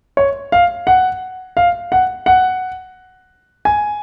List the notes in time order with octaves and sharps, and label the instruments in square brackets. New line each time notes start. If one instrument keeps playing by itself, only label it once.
[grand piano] C#5
F5
F#5
F5
F#5
F#5
G#5